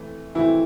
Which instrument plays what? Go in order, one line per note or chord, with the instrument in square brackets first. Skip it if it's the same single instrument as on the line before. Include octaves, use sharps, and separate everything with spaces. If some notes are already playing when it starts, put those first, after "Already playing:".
Already playing: [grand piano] E3 A3 C4
[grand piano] E3 A3 C4 [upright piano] E4